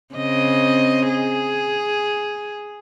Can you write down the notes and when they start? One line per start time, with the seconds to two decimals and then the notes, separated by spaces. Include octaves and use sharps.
0.15 C#3 C4 D#5
1.09 G#4